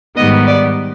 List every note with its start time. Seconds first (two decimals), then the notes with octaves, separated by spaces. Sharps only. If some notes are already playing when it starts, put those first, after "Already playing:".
0.16 G#2 D#3 G3 B3 D#5
0.47 D5